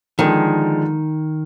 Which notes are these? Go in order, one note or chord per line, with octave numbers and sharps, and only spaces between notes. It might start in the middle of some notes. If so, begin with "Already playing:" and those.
D3 D#3 F3 G#3